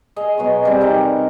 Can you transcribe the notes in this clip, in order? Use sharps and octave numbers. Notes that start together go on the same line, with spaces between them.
G#4 D#5 F5
B2 F#3 C#5 C6
C3 G3 C4
D#4 A#4 F#5 C6